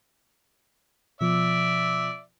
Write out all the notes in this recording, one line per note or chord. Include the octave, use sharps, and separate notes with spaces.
B2 F3 D5 E5